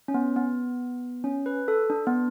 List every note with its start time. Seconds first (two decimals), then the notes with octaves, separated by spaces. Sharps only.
0.08 C#4
0.14 B3
0.36 B3
1.24 C#4
1.46 B4
1.68 A4
1.90 D4
2.07 B3